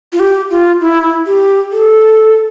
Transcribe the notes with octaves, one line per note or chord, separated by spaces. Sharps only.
F4
G4
F4
E4
G4
A4